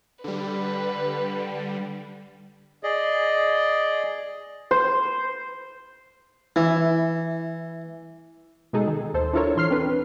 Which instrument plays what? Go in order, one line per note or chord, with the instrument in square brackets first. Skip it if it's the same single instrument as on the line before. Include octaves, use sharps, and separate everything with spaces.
[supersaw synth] D3 G3 [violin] B4
[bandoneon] G#4 D5 D#5
[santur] C5
[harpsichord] E3 [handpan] E4
[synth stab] B2 G#3 D#4 G#4 A4
D#3
D#2 A4 C5
D4 E4 F4 A4 A#4 C#5
A#2 E3 C6 F6 C7
C4 D4 B4